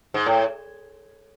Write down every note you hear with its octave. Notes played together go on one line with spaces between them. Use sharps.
G#2
A2